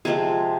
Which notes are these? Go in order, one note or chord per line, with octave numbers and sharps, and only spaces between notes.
C3 F3 G#3 C4 G#4